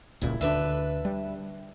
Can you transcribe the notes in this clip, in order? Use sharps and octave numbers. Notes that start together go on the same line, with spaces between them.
D#1 C#2 A#2 E4
D2 D3 D4 B4 E5
G3